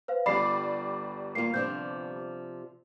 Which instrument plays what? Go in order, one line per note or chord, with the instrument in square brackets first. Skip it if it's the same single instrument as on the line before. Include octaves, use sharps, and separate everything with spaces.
[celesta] B4 C5 F5
[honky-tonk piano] G1 G3 D5 [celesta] B5 D6 C7
[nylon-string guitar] A#3 F4 [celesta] C7
[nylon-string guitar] C3 F3 D4 [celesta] G6